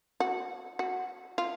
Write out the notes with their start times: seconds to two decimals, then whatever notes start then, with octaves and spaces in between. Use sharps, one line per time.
0.20 F#4
0.79 F#4
1.38 F4